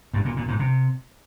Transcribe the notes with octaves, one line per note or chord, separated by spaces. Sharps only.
G2
A#2
A#2
G#2
C3